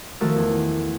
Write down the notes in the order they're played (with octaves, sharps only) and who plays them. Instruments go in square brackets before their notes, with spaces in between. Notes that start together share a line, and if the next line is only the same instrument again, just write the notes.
[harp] D#3 F3 A3 F#4 A4 A#4
E2